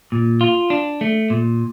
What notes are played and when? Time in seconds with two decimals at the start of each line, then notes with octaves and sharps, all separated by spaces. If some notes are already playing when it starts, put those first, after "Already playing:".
0.12 A#2
0.41 F4
0.70 D4
1.01 A3
1.30 A#2